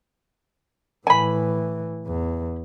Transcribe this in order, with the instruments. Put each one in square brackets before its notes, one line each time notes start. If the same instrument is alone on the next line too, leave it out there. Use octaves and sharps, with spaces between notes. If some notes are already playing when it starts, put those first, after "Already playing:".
[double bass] A2 E3 [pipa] G#5 B5
[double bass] E2